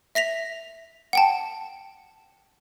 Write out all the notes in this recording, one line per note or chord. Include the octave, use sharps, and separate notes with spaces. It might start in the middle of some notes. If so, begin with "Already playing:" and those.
E5 A#6 B6 F7
F#5 G5 A5